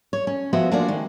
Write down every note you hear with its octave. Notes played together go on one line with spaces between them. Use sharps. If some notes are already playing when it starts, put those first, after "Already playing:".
C#5
C#4
F3 G#3 B3 F#4 C5 E5
F3 G#3 A#3 D4 F#4 D5
D#3 G#3